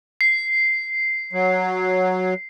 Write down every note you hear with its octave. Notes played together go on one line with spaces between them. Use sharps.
C7
F#3